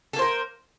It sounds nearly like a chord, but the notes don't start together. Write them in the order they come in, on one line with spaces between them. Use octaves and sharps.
A4 A#3 C5 A#4